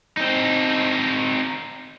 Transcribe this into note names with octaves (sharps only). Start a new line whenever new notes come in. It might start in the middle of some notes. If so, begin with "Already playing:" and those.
C4 D#4